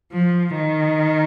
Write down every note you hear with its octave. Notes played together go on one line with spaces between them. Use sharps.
F3
D#3